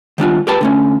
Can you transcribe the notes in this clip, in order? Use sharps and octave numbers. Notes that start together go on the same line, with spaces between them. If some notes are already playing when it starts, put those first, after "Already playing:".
D#3 G3 D4 F4
G4 A#4 B4 G5 A5
D3 A3 C#4